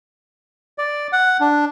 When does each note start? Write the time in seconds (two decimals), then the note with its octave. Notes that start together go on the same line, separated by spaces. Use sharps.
0.78 D5
1.13 F#5
1.40 D4